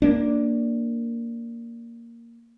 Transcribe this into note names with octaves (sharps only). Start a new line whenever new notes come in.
A#3 D4